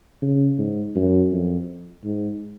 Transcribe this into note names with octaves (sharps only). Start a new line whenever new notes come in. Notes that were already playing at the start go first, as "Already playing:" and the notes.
C#3
G#2
F#2
F2
G#2